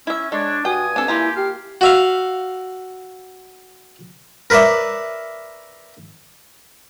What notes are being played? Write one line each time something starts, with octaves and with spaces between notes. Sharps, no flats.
C#4 E4 E5
G#3 D4 C#5
G2 F#4 G5 G#5 D#6
C4 D4 A4
A#3 E4 F4 G4 A#5
G4 F5
F#4 E5 F5
A#4 B4 C#5 D5 E5